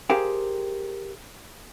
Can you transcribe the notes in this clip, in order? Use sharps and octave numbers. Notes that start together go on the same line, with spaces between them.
G4 G#4 A#4 C5 F5 G5